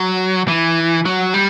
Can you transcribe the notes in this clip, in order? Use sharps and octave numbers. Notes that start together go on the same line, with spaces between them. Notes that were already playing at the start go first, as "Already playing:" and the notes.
Already playing: F#3
E3
F#3
G3